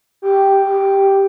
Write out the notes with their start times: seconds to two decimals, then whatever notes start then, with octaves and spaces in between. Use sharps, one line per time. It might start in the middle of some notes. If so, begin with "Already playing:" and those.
0.22 G4
0.66 G4